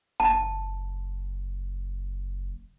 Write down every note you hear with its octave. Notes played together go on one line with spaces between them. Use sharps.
F#1 A5